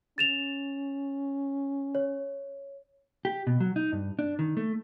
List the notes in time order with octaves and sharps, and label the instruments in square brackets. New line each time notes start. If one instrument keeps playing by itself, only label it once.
[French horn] C#4 [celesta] A6 E7 F7
[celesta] C#5
[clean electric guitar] G4
B2
F#3
D#4
G2
D4
D#3
A3